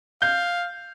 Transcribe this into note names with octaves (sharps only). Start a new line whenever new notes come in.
F5 G6